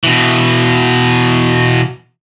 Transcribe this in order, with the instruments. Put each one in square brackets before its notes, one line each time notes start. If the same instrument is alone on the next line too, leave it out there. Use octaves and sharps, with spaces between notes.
[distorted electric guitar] B2 E3